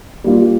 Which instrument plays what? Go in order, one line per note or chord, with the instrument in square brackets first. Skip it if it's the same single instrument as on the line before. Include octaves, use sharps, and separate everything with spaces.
[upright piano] G3 A#3 F4